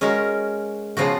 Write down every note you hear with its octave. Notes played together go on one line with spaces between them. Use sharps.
G#3 C#4 F#4 A#4
C#3 F3 B3 F#4